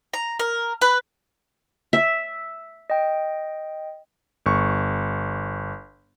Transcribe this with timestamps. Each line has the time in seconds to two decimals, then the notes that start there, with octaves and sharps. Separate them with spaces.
0.13 A#5
0.40 A#4
0.81 B4
1.93 E5
2.90 D#5 G5
4.46 G1 C#6